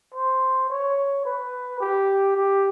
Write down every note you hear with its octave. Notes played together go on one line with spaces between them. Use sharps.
C5
C#5
B4
G4
G4